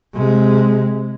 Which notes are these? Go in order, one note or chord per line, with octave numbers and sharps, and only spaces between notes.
C3 G#3